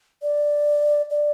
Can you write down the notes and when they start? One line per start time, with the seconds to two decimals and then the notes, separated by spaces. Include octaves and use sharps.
0.22 D5
1.10 D5